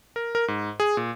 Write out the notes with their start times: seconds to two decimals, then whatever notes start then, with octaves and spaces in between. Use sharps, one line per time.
0.16 A#4
0.35 A#4
0.48 G#2
0.80 G#4
0.97 A#2